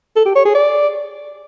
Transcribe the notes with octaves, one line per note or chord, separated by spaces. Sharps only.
A4
G4
C#5
G#4
D5